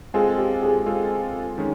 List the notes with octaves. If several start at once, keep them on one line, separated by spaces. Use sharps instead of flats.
G#3 C4 F4 G#4 A4
G4
G#4
G#3 C4 F4 A4
D#3 G#3 C#4